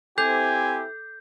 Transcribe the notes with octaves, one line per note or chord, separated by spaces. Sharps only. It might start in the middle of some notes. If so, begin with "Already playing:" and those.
C4 E4 G4 A4 G#5 G6